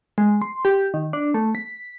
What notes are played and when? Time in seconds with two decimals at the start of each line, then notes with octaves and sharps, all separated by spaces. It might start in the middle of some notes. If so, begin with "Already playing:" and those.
0.18 G#3
0.42 C6
0.65 G4
0.94 D#3
1.13 D4
1.34 A3
1.55 B6